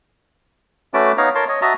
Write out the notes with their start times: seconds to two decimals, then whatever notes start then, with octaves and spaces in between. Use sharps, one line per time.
0.94 A3 C#4 F#4 B4 A5 D6
1.18 B3 D#4 C#5 F5 A#5
1.35 A#4 C#5 A5 C6
1.48 C#5 D#5
1.62 F#4 D#5 E5 A5 A#5